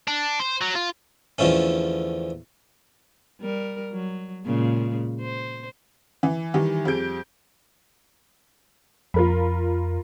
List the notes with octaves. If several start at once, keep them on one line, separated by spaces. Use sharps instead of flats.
D4
C5
F#3
F4
E2 D3 F3 A3 C#4
G3 A#4
F#3
A#2 C#3 G#3
C5
E3
D#3 E3 G3
F2 G3 G#4 G6 D7
F2 F4 A#4 B5